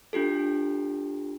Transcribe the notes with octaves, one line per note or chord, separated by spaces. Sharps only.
D4 F4 G4 A4